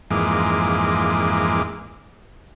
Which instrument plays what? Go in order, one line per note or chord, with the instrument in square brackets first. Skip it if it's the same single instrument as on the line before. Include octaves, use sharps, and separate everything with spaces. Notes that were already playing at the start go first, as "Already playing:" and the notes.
[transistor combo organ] F2 G#2 E3 G#3 A#3 D6